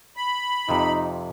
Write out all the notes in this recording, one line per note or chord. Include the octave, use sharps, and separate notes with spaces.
B5
F2 C3 D#4